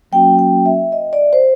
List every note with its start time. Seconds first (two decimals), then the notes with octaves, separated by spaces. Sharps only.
0.12 F#3 A#3 C#4 F#4 G5
0.39 G5
0.66 E5
0.92 D#5
1.13 D5
1.33 C5